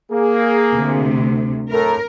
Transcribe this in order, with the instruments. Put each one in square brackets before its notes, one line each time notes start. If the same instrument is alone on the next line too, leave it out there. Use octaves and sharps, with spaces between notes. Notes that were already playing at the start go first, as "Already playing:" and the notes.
[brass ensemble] A#3 G#4
[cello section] D2 C3
[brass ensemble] A2 A3 A#5 [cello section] A#4